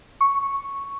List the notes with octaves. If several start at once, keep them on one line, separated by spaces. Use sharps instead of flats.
C#6